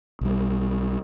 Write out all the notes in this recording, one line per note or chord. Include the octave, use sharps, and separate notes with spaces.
B1 G3